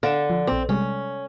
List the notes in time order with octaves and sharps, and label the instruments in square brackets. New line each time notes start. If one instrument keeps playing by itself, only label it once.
[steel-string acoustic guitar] D3 [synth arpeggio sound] F5 D7 E7
[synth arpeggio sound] F3
[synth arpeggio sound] A#1 D5 [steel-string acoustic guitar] C4
[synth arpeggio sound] C3 G3 G#3 [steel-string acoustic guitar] C#4